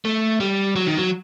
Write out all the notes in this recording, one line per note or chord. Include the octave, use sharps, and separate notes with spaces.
A3
G3
F#3
D#3
F#3